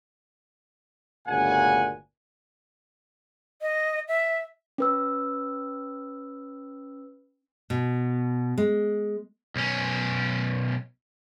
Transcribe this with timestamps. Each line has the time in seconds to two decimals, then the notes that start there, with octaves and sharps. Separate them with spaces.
1.28 G1 D2 A#2 C#3 F#5 G#5
3.62 D#5
4.08 E5
4.78 C#4 B4 E6
7.70 B2
8.58 G#3
9.56 B1 C#4